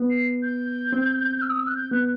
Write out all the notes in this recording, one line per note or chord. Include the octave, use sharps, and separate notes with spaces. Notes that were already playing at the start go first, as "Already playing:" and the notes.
Already playing: B3
C7
G6
C4
E6
D#6
E6
F#6
G6
B3 F#6